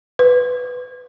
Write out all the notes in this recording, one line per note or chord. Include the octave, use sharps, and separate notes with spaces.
B4